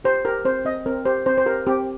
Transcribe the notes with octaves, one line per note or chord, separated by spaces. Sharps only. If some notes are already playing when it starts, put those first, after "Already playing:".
G4 C5
G4 A#4
C4 C5
C4 D#5
C4 A#4
G4 C5
C4 C5
C5
G4 A#4
C4 G4